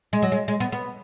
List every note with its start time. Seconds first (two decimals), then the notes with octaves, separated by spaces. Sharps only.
0.13 G#3
0.22 F#3
0.32 G#3
0.48 G#3
0.60 B3
0.72 B3